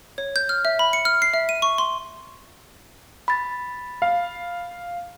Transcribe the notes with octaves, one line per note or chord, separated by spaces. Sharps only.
C#5
G6
F6
E5
B5
C#7
F6
C7
E5
D#7
C#6
C6
B5 A6
F5